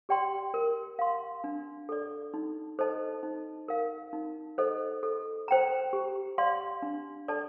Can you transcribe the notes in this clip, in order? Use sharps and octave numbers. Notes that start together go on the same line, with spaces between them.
G4 D5 G5 C6
A#4
F5 C6
D4
A4 D5
D#4
A4 C5 D#5 A5
D#4
A#4 F5
D#4
A4 C5 D#5
A4
C5 G5 A#5
G4
D5 F5 C6
D4
A4 D5 A5